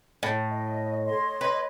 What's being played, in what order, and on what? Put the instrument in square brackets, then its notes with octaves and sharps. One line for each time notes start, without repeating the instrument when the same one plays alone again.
[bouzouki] A2
[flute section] D#5
C#5 D#5 C6
[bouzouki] B4